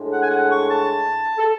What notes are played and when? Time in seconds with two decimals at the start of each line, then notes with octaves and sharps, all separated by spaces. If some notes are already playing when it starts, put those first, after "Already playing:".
Already playing: A2 G#3 D4
0.11 F#5
0.21 G#5
0.30 F#5
0.49 C#6
0.69 A5
1.38 A4